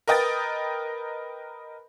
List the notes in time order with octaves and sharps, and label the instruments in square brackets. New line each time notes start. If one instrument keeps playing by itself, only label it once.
[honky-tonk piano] A#4 B4 D#5 G5 D#6 A6